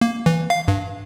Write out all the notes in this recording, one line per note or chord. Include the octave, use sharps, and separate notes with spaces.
A#3
E3
F5
G2